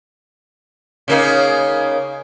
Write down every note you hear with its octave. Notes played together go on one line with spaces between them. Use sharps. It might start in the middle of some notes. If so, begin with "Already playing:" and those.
C#3 A#3 D#4